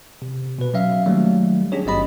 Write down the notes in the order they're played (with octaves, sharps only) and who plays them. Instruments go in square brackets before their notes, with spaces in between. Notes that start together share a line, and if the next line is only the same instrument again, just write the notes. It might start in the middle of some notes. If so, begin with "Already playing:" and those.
[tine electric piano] C3
B2 B4
F#3 C#4 E5 F5
D#3 F#3 G3 A3 A#3
C#4 D4 G4 G#4 C#5
G#1 G2 C4 D#5 B5